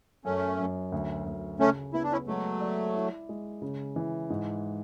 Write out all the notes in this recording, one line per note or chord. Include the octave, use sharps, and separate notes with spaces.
F#2 A3 C#4
F#2
D2
D2
C#3 A3 C#4
B3 E4
D4
C#4 E4
F#3 G#3 A3
D5
E4
G#3
C#3
E3
G#2